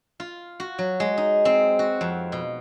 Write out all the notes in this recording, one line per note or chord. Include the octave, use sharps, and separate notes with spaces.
F4
F#4
F#3
G#3
D#4
C4
F#4
F2
B2